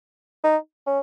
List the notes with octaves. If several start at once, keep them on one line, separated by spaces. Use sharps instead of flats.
D#4
C#4